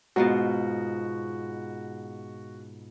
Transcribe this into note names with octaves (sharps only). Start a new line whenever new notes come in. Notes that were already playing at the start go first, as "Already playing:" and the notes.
G#2 B2 F4 F#4